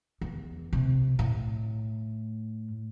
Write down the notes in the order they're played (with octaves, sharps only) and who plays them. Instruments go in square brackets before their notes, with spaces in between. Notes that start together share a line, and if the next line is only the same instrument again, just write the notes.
[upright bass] E2
C3
A2